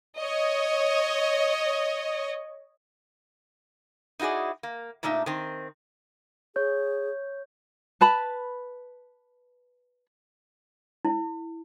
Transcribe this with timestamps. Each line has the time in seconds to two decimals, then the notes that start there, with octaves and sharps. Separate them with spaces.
0.19 C#5 D#5
4.19 D#4 E4 F#4 G#4 D5
4.63 A#3
5.03 A#2 A3 D4 D#4 E5
5.26 D#3 C4
6.56 G#4 C#5 G6
8.01 B4 A5 B5
11.05 E4